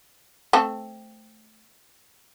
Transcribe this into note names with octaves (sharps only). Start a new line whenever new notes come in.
A3 C4 A4